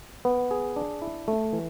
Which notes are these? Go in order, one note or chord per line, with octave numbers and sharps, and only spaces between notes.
B3
G#4
D4
E4
A3
E3